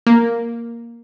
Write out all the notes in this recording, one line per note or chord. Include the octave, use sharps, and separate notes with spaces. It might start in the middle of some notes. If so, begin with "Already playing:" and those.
A#3